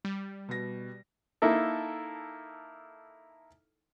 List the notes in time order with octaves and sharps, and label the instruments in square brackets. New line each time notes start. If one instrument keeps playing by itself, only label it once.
[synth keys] G3
[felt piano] B2 A#6
[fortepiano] A#3 D#4 E4 A4